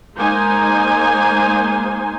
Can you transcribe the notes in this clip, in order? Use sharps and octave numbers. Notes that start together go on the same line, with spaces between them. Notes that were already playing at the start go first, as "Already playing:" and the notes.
G#3 A#3 D#4 C5 G#5